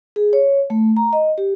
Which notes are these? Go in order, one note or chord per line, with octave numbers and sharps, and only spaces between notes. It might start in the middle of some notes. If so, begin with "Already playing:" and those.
G#4
C#5
A3
A#5
D#5
G4